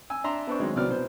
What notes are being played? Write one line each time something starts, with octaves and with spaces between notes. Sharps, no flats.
G#5 E6
D4 E5 A#5 C6
B3 D4 C5 C#6
D#3 F#3 G#3 C4 D#4
C2 B2 F#3 B3 D5 F6
B2 B3 C5